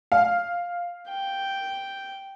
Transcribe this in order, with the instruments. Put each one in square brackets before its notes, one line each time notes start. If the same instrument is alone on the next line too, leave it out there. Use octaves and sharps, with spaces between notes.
[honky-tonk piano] F5
[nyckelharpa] G5